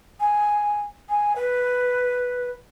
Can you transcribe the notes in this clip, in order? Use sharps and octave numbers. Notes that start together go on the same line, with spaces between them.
G#5
G#5
B4